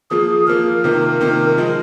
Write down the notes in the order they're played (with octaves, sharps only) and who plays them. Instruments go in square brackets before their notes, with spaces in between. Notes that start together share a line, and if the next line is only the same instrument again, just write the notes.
[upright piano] F3 A#3 F4 [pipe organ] G#4
[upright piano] F3 A#3 F4 [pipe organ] A#4
[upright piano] C3 D#3 A#3 F4
C3 D#3 A#3 F4
F3 G#3 C4 D#4